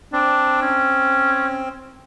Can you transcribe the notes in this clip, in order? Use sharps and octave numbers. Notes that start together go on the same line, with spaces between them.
C4 D4
C#4